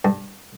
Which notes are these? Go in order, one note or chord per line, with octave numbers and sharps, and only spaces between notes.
G2